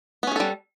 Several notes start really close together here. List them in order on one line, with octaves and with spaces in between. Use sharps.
B3 C#4 G#4 A4 G3